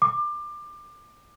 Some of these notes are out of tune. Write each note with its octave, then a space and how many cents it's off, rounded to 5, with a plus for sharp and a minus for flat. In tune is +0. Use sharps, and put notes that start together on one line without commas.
D6 +25